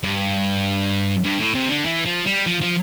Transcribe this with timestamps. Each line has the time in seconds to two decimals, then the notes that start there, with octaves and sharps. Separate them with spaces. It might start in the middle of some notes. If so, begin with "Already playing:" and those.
0.03 G2
1.24 G2
1.40 A2
1.55 C3
1.70 D3
1.86 E3
2.06 F3
2.26 G3
2.47 F3
2.61 F3